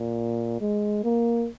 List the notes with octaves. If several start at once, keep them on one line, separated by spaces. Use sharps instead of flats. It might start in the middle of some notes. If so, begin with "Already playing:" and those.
Already playing: A#2
G#3
A#3